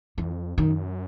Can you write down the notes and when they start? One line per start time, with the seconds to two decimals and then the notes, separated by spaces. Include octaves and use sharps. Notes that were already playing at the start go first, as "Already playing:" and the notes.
0.18 F2 E3
0.57 F#2 D#3